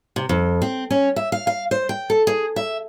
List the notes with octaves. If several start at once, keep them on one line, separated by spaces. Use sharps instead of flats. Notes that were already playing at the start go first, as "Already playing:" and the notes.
C3
F2
C4
C#4
E5
F5
F5
C5
G5
A4
G#4
E5